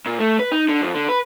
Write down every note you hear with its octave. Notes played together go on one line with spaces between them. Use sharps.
A#2
A3
B4
D#4
D3
F2
D3
B4